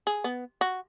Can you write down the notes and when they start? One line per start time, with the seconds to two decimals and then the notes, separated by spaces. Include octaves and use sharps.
0.07 G#4
0.24 B3
0.61 F#4